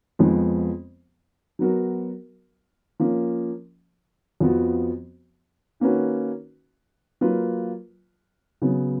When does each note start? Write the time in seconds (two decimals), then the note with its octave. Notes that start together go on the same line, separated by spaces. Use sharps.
0.19 F2 F3 G#3 B3
1.59 F#3 B3 F#4 A#4
3.00 F3 A#3 C#4
4.40 F2 F3 B3 F#4
5.80 D#3 A#3 C#4 F#4 B4
7.21 F#3 A#3 F4 B4
8.62 C#3 F#3 B3